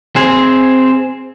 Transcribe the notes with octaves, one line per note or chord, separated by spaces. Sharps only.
C4 G#4